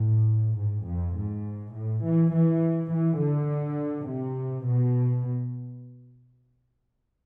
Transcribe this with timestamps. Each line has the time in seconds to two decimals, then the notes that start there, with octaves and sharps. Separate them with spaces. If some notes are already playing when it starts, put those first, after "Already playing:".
Already playing: A2
0.58 G#2
0.87 F2
1.16 G#2
1.74 A2
2.04 E3
2.33 E3
2.91 E3
3.21 D3
4.08 C3
4.66 B2